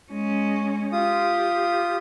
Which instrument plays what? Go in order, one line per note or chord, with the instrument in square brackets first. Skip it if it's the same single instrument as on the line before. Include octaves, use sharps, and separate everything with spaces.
[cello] G#3 C#4
[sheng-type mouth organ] F4 D#6 [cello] G4